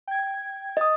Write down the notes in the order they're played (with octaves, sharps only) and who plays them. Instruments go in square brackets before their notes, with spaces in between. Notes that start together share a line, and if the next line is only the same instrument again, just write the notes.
[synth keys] G5 G#6
[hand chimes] D#5 D#6